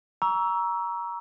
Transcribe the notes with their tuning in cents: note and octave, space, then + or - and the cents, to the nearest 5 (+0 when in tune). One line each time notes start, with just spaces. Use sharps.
A#5 +20 C#6 +35 E6 +0